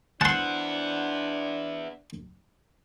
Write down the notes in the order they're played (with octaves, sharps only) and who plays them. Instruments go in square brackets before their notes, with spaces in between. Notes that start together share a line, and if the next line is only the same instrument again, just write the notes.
[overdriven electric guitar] B3 E4 [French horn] D4 [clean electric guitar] C5 F#5 [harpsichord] A5 C6